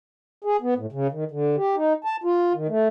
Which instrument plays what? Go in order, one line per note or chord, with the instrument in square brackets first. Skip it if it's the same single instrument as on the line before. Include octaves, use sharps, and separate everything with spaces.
[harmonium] G#4
B3
A2
C#3
D#3
D3
G4
D#4
A5
F4
D#3
A3